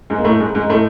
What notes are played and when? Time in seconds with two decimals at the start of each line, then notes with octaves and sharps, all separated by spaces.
0.10 G#2 G#3
0.18 A#3
0.24 A2 A3
0.40 G#2 G#3
0.55 G#2 G#3
0.70 A2 A3